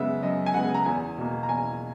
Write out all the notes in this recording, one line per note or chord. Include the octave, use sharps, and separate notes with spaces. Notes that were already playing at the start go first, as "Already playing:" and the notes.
Already playing: F#2 C#3 G#3 B3 E5
F#2 D#5
G#5
C#3 G#3 B3 F#5
A#5
E2 G#5
B2 A#3
A#5
E2 G#5